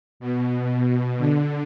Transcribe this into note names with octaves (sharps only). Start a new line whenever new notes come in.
B2
D3